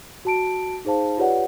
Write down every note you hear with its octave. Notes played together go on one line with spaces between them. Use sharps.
F#4 A5 D7
D#4 G#4 C5 F5 A5
F4 G4 B4 C#5 D5 F#5